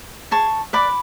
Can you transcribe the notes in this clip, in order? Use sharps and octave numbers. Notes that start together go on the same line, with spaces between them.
G#4 A5 C#6
B4 D5 B5 D6